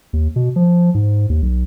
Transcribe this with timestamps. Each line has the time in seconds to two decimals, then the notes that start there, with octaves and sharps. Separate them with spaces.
0.13 D#2
0.36 B2
0.56 F3
0.95 G#2
1.30 D#2
1.42 B1